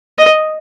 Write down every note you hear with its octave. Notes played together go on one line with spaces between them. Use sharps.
D#5